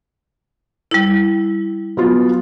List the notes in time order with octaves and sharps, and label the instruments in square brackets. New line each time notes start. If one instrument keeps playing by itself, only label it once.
[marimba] G3 E4
[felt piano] F#3 B3 F4